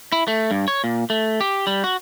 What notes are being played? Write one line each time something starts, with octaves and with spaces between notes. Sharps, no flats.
E4
A3
G2
C#5
A#2
A3
G4
G3
F#4